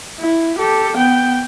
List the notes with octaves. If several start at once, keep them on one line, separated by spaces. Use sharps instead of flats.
E4
G4 A4
B3 G5